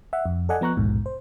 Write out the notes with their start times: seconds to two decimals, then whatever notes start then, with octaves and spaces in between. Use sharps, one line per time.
0.13 E5 F#5
0.26 F2
0.49 A4 D5 D#5 F#5 G#5
0.61 F3 B3 A#5 C#6 F#6
0.77 A#1 D#2 G#2 B2
1.06 C5